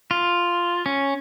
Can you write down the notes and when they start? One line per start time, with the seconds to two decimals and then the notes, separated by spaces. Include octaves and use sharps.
0.11 F4
0.86 C#4